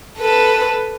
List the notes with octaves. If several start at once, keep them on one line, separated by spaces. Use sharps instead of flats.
A4 B4